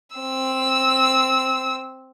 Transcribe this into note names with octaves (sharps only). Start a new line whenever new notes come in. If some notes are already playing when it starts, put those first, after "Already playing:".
C4 E6